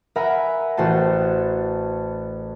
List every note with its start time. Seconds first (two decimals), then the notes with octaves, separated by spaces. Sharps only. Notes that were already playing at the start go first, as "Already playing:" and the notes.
0.16 A#4 E5 F#5 G#5 A#5 B5
0.77 A1 F#4 C5 A5